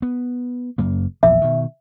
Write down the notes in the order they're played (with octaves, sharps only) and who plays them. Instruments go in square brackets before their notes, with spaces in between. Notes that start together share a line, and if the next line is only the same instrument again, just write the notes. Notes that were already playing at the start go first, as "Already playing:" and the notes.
[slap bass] B3
F#1 F#2 A#3
[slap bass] A#1 E2 F3 [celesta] E5
[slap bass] B2 D#3